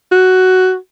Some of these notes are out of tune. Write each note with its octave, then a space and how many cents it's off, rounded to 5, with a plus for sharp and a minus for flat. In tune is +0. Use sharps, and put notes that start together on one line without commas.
F#4 +10